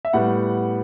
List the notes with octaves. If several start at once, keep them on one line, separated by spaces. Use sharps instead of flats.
E5
A2 G3 B3 F#5